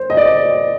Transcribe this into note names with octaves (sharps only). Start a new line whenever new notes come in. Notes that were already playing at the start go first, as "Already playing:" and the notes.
Already playing: C5
D#5
D5